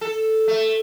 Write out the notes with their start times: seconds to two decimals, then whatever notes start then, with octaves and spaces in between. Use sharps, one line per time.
0.01 A4
0.48 A3